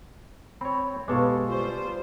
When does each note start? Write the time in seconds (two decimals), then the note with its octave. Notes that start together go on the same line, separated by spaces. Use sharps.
0.61 C4 C#5 B5
1.08 B1 G#3 G4 A4 B4 F5 C#6 D6
1.47 G3 F4 C5